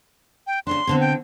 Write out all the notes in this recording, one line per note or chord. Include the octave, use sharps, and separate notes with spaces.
G5
C#3 A3 D4 C6
B2 D3 C4
G5